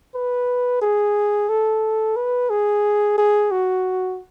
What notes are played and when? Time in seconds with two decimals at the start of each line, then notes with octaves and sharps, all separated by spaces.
0.15 B4
0.81 G#4
1.49 A4
2.16 B4
2.50 G#4
3.17 G#4
3.51 F#4